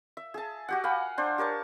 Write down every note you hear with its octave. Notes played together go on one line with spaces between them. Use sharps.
E5
G#4 A5
F#4 G4 F#5
F5 F#5 G#5 B5
D4 C5
G4 A#4 C#5 A5